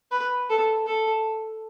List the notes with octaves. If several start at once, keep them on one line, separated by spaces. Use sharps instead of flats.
B4
A4
A4